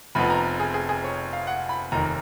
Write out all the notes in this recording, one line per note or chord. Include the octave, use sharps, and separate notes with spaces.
F1 F2 F3 B3 B5
A#5
G#4
G#4
G#4
C#5
F5
F#5
B5
F1 D#2 D#3 A#5